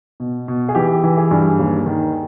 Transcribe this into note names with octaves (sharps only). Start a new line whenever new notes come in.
B2
B2
G#4
E3 G4
E3
G#4
G2
D#2
D#3